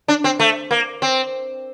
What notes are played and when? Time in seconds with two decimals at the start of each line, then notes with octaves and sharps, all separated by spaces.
0.08 D4
0.24 C4
0.39 A3
0.71 A#3
1.02 C4